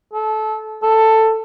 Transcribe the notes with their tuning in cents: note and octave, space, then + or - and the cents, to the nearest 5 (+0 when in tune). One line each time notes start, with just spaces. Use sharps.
A4 -25
A4 +10